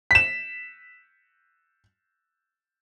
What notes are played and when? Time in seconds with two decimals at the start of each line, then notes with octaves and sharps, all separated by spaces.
0.11 B6 E7